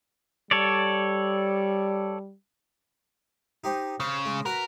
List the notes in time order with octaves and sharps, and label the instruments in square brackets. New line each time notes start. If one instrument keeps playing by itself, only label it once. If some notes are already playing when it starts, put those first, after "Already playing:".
[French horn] G3 [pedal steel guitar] A4 C#5 D5
[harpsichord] D#4 G4 C5
[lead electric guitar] C#3 [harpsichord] C5
[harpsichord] G#3
[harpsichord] F#4 B4 [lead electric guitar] A#4